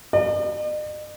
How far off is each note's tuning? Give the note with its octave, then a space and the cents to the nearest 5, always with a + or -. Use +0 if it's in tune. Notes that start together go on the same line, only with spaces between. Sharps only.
D#5 -45